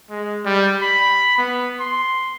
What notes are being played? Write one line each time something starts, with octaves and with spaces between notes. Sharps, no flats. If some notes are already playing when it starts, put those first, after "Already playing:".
G#3
G3
B5
B3
C6